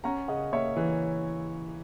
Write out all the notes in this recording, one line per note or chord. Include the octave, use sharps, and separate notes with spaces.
C#4 F#5 A#5
C#3 D#5 F#5
A#3 C#5 E5
E3